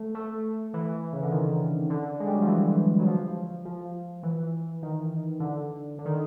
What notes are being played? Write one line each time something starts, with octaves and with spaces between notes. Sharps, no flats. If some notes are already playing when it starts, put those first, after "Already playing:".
Already playing: A3
A3
E3
C#3
D3
D#3
D3
G#3
G3
F#3
F3
E3
F#3
F3
F3
E3
D#3
D3
D3
D#3